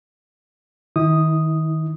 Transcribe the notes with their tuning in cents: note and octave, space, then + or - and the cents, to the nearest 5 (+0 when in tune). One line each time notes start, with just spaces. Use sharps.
D#3 +15 E4 -45 D#6 +0